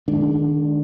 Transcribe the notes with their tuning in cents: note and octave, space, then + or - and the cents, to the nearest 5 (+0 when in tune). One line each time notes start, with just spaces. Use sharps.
D#3 -20 G#3 +25 D4 -5